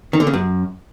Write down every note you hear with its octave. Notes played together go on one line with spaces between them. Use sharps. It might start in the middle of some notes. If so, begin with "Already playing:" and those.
D#3
D3
C#3
F#2